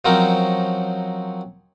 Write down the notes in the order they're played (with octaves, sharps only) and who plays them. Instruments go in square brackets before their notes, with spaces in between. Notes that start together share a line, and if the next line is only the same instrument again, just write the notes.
[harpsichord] F3 F#3 C4 C#4 D#4 A#4